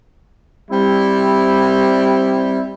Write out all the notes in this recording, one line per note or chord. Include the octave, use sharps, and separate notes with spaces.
G3 C4 E4